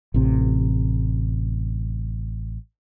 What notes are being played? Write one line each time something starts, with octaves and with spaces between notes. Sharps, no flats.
A1 C3